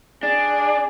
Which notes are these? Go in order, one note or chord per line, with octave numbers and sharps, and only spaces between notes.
D4 G#4